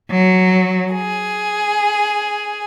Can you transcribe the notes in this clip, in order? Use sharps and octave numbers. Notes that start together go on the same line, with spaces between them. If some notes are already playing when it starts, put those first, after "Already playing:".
F#3
G#4